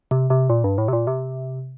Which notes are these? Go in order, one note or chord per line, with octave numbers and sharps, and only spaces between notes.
C3
C3
A#2
G2
A2
C3
A#2
C3